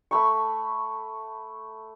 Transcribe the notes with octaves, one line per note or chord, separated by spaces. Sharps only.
A3 B5 C#6